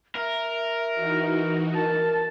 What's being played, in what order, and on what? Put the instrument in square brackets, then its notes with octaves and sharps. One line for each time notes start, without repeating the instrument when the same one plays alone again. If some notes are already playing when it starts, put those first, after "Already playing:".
[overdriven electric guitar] A#4 [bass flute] E5
[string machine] E3 D#4 F#4
[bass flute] A#4 [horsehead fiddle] A5